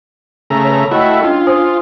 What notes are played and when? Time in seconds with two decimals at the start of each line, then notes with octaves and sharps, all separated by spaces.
0.50 C#3 A3 A#5
0.64 B4 C#5
0.91 A3 E4 F#4 D#5 G5
1.23 C#4 D4 F4
1.47 C5 G#5 D#6